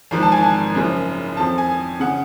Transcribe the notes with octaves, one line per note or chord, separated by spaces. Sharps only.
G#1 G#2 F3
A5
G#5
A5
F#1 F#2 C#3 F3
F2 F3 A5
G#5
C#3 F#5